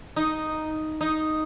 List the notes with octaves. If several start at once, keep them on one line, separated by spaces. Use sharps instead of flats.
D#4
D#4